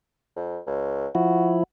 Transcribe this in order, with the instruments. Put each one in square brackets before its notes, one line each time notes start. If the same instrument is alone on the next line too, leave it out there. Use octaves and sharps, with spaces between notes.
[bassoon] F2
C#2
[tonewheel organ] F3 E4 [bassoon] F#4